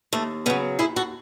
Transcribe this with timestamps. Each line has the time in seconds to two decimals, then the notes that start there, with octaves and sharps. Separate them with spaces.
0.13 D#2 A3
0.46 C#3 F#3 B3
0.79 D#2 E4 G#4
0.96 F#4 A4